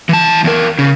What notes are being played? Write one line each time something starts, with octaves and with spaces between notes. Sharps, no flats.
E3 A5
E2 A#4
C#3